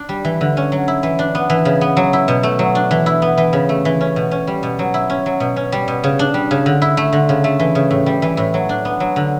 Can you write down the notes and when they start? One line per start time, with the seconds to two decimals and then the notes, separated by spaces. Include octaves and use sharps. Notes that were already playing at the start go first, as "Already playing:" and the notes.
Already playing: D4
0.09 G3
0.25 E3
0.41 D3
0.57 C#4
0.72 F#3
0.88 E4
1.03 E3
1.19 D4
1.35 B3
1.50 E3
1.65 C#3
1.81 B3
1.97 F#3
2.13 E4
2.28 B2
2.43 A3
2.59 F#3
2.75 D4
2.91 E3
3.06 E4
3.22 B3
3.38 E3
3.53 C#3
3.69 A3
3.85 E3
4.01 C#4
4.16 B2
4.31 C#4
4.47 G3
4.63 B2
4.79 F#3
4.94 E4
5.10 C#4
5.26 F#3
5.40 B2
5.56 C#4
5.72 G3
5.88 B2
6.04 C#3
6.19 D4
6.34 G3
6.51 C#3
6.66 D3
6.82 E4
6.97 A3
7.13 D3
7.29 C#3
7.44 A3
7.60 E3
7.75 C#3
7.90 A2
8.06 G3
8.22 E3
8.37 A2
8.54 F#3
8.69 D4
8.85 B3
9.00 F#3
9.16 D3